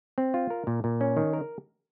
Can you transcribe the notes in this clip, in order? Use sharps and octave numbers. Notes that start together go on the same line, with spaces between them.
C4
F4
A#4
A#2
A#2
C#4
D#3
A#4